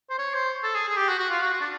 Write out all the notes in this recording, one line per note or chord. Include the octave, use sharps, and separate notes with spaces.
C5
C#5
C5
A4
G#4
G#4
G4
F#4
F#4
F4
F#4
F#4
D4